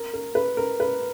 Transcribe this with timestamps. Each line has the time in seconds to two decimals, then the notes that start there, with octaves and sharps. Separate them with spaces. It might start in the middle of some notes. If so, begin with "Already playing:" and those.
Already playing: A#4
0.14 A#4
0.35 B4
0.57 A#4
0.80 B4